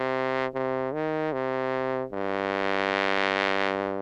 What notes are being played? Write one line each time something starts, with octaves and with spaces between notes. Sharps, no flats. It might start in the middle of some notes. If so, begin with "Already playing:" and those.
Already playing: C3
C3
D#3
C3
G2